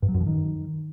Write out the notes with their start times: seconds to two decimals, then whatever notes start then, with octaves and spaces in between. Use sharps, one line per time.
0.02 G2
0.08 F#3
0.14 F#2
0.20 F3
0.26 D#3